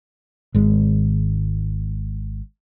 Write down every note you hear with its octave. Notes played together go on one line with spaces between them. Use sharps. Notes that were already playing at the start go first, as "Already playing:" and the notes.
G#1 G#3